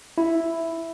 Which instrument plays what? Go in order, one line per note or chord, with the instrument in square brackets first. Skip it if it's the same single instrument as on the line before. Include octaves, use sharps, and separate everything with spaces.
[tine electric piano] E4